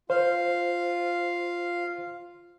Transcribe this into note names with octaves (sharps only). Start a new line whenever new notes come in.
F4 C5 F5